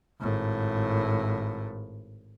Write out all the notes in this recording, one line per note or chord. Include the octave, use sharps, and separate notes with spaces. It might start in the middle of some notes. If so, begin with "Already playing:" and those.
G#1 A2